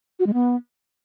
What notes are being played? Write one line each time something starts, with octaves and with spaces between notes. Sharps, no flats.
F#4
G#3
B3